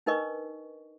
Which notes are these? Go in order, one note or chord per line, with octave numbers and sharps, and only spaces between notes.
D4 D#4 A#4 B4 D#5 C#6